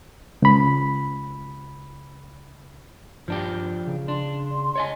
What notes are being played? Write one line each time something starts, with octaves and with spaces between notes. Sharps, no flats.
C#2 B5
G2 F3 D4 G4
C#3
D4 C6
C#5 D#5 G#5